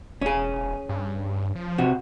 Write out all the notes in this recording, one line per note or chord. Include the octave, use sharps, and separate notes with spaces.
E1 C#4 G#4
G2
F3
C3 F#4